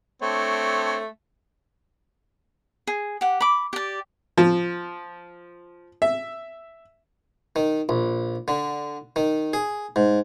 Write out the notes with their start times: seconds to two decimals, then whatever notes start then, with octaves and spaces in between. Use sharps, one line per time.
0.22 A3 C4 D4 C#5
2.87 G#4
3.21 G4 F#5
3.40 B5 D6
3.73 G4 D5
4.38 F3
6.02 E5
7.56 D#3
7.89 A#1
8.48 D3
9.16 D#3
9.53 G#4
9.96 G#2